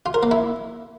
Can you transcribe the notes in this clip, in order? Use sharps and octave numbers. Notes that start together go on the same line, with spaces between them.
F4
A#4
A#3
E4